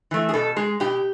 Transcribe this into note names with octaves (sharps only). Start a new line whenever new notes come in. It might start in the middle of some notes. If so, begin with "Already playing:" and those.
E3 A3
G#4
B2 A4
G#3 G#4
B2 G4